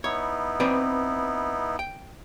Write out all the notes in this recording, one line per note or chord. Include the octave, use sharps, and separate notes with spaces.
B3 D#4 E4 C#5
C4 B4 D5
G5